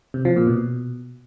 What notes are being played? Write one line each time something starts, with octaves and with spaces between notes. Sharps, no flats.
C3
F3
A#2
B2